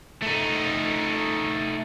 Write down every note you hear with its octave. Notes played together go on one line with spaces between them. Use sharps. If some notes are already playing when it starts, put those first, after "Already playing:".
A3 D#4